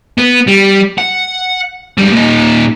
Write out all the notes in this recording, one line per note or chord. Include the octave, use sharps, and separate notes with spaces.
B3
G3
F#5
G#2 G3
A#2 D#4